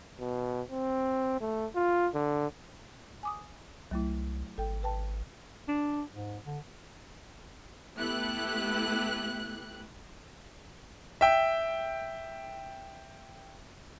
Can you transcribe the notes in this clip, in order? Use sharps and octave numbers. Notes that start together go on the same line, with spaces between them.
B2
C4
A3
F4
D3
G#5 D6 D#6
C2 F#3 A3 E4
G#1 A4 G5
B4 G5 A5
D4
G#2
D3
A3 B3 E4 G4 F#6
E5 G5